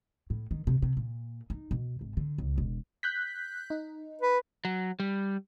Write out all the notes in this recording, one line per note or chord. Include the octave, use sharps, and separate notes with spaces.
A2
D#3
C3
C3
A#2
D#4
B2
G#1
D3
C#2
E1
F#6 G6 B6
D#4
B4
F#3
G3